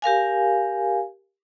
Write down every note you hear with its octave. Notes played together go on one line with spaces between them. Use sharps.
G4 A#4 F5 G#5